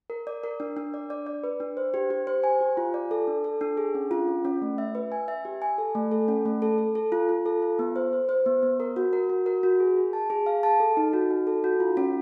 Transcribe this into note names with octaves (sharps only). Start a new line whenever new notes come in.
A#4
D5
A#4
D4
D4
D5
D5
D5
B4
D4
C5
G4
G4
C5
G#5
G4
F4
D5
A4
D4
A4
D4
G#4
C#4
F4
C#4
C#4
A3
E5
B4
G#5
E5
G4
G#5
A4
A3
A4
C#4
A3
A4
A4
A4
F4
F4
A4
F4
B3
C5
C5
C5
B3
B3
A#4
F#4
A#4
F#4
A#4
F#4
G#4
G#4
A5
G#4
F5
A5
A4
D#4
F#4
D#4
A4
F#4
F4
C#4